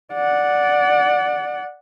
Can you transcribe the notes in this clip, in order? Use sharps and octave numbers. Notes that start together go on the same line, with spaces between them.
D5 F#5